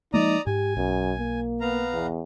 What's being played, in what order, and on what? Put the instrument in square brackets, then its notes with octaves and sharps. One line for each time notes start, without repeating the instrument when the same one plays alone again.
[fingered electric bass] F3 G#3 A#3 [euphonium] D#4 [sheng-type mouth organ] D5 A#5 D#6
[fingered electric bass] G#2 [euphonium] G4 [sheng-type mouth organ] G#5
[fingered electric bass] B1 [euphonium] F#2
[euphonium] A#3
[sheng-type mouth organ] B3 F5 A#5
[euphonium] E2